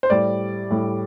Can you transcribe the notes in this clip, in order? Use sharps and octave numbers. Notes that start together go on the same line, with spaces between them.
C5
A2 G3 D5
A2 G3